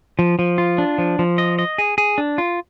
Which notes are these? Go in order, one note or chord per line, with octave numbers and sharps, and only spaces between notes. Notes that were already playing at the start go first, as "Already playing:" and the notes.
F3
F3
F4
D4
F3
F3
D#5
D#5
G#4
G#4
D4
F4